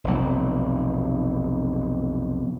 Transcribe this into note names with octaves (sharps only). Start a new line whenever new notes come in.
F1 B1